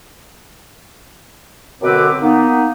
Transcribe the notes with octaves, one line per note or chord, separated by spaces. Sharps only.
F#2 B2 D3 C4 B4 D6
A#3 B3 D#4